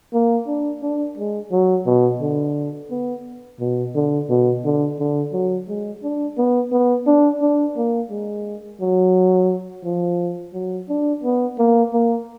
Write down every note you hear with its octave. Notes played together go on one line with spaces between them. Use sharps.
A#3
D4
D4
G#3
F#3
B2
D3
B3
B2
D3
B2
D3
D3
F#3
G#3
D4
B3
B3
D4
D4
A#3
G#3
F#3
F3
F#3
D4
B3
A#3
A#3